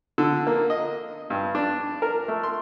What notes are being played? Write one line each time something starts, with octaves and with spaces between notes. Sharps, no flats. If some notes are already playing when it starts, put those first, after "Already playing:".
D3
A#3
D#5
G2
D4
A#4
A3
C6